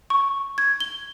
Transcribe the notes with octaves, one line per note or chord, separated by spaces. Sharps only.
C#6
G#6
G7